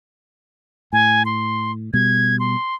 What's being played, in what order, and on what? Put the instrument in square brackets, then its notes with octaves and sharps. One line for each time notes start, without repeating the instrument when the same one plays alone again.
[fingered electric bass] A2 [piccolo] G#5
[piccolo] C6
[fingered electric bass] B2 G3 [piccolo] G#6
[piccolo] C6